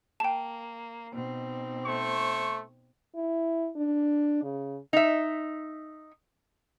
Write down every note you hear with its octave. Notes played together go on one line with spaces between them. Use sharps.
A#3 G5 A5
B2 C4 D#4
A3 C5 C#6
E4
D4
C#3
D#4 E5